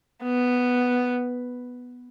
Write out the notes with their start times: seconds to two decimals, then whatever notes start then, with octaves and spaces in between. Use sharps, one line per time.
0.23 B3